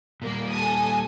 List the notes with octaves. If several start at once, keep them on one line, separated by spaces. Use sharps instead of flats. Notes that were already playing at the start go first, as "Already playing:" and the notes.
A#2 G3 A#3
A4 G#5 A5 D#6